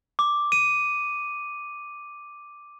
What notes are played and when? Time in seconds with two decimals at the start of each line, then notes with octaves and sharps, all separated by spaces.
0.19 D6
0.52 D#7